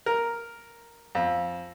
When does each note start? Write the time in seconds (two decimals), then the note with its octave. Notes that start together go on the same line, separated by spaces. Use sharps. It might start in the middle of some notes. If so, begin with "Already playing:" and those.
0.06 A#4
1.15 F2